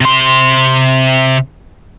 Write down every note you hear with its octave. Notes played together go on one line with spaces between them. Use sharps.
C3 C6